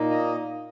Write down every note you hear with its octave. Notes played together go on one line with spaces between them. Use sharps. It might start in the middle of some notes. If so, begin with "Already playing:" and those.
Already playing: A#2 A#3 D#4
D#5